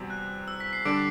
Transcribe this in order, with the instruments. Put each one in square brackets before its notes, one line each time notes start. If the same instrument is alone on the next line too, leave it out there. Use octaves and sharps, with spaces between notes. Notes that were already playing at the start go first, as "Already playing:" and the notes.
Already playing: [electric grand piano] E2 C3 G3 C4 F#4
[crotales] F#6
E6
B6
C7
[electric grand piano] D3 G3 D4 A4 [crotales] D6 D7